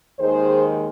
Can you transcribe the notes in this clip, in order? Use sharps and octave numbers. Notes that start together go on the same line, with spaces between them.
D#2 D#3 G#3 G#4 C5